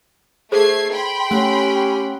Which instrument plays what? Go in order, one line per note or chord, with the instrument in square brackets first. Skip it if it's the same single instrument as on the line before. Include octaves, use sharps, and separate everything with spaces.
[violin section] A3 G#6 C7 [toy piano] G#4 A4 C5
[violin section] G5 B5 C6
[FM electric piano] A3 F#5 F#6 [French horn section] C#4 G4